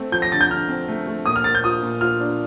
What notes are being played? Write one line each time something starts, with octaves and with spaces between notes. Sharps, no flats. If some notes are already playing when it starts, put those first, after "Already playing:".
Already playing: A3 C4
F3 G6
A#6
D3 A6
G6
D3 F6
C4
A3
A3
A#2 D#6
F6
A#2 A6
G6
F4 D#6
A#2
F4 F6
D4